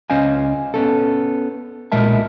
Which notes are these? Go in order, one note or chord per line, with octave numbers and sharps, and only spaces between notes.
C#2 C#4 C5 D#5 F5 G#5
B3 C#4 A4
B1 A#2 G#3 A#4 E5 A5